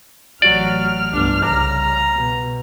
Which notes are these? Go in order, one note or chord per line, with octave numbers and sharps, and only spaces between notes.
A1 F#3 F#4 D5 F6
G1 C2 D4
C2 C#3 A#5
B2